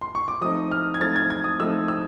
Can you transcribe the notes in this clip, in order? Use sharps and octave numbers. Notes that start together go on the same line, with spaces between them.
C6
C#6
D6
F3 A3 C4 D#4 D#6
F6
G#6
F3 A3 C4 D#4 A6
G#6
G#6
D#6
F3 A3 C4 D#4 E6
E6